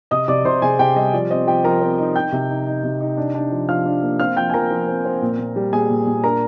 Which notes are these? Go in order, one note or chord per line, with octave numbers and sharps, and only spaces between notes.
C3 D#5 D#6
C3 D5 D6
C3 C5 C6
C3 G#4 G#5
C3 G4 G5
G3 D#5
F3 D5
C4 D#5
F3 G4 G5
F3 A#4 A#5
C4
D#4
D#4 G5 G6
C3
D#4
D#4
C3
D#4
D4
D4
F3
F3 F5 F6
D4
A#3
C4 F5 F6
F3 G5 G6
G#5
F3 A#4 A#5
F3
C4
C4
A#2
A#2
G3
A#2 G#4 G#5
A#2
A#2
D4 A#4 A#5